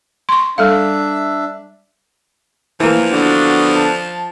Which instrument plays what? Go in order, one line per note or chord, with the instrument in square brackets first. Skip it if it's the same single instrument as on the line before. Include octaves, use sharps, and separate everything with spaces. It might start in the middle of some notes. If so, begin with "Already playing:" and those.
[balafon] C6 C#6
[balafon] G3 A4 F5 [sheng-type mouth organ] D4 E5
[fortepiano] E3 A#3 [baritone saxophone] F3
[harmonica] D3 B3 D4 [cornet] F#4
[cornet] A5